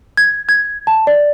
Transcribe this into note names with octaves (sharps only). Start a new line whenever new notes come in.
G#6
G#6
A5
D5